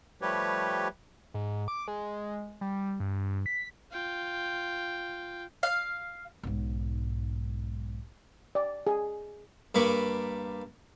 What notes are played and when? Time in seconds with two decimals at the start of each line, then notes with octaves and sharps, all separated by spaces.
0.21 F3 G3 A3 G4 B4 C#5
1.34 G#2
1.68 D6
1.88 G#3
2.61 G3
3.00 G2
3.46 B6
3.91 F4 G5
5.63 F5
6.43 B1 G#2
8.55 D5
8.87 G#4
9.75 G2 A#3 B5 C#6 D6